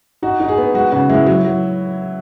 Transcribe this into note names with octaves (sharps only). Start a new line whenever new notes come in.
D#4 F#4
D#4
G#4
B3
G#3 F#4
C#3 F#4
G#3 E4
F#3
F#3